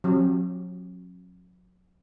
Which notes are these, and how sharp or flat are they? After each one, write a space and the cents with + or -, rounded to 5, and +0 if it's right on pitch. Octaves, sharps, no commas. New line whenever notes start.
F#3 -40 C#4 -45 G4 -25